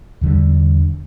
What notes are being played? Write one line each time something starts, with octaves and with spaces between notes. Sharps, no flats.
E2 D3 G3